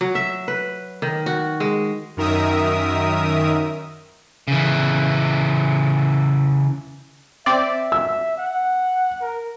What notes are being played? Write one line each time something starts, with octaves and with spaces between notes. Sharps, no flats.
F#3
E5
B4
D#3
F#4
G#3
F#2 D#3 A#4 E5 D#6
C#3 E3
C4 D5 E5
E6
F#5
A#4